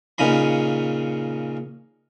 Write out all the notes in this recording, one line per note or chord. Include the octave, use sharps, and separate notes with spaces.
A#2 C#3 D#4 D#5 B5